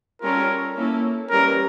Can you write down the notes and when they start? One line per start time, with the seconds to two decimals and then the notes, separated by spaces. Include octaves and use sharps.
0.22 G3 C#4 F4 A4 A#4 C#5
0.76 A#3 C#4 E4 A4
1.30 E3 G3 C#4 A#4